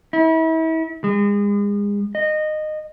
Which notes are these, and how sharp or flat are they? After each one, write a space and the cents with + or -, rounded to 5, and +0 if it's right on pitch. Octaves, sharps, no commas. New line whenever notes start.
E4 -35
G#3 -35
D#5 -20